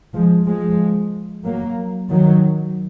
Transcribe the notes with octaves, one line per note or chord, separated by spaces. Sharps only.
F3 G#3
F3 G#3
F#3 A#3
D#3 F#3